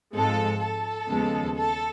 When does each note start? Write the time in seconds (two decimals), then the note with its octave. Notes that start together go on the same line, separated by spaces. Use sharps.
0.14 G#2 F3 G#3 C4 F4 A4
0.61 A4
1.08 D#2 C#3 F3 G#3 B3
1.55 A4